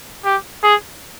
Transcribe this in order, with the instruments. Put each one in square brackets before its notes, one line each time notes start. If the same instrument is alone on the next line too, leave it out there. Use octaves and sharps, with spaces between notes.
[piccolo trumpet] G4
G#4